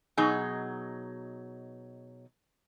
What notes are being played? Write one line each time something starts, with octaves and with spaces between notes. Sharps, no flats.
B2 F#3 D#4 G#4